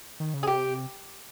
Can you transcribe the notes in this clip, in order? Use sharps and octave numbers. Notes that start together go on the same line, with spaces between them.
D#3
C#3
G#4
C3 G4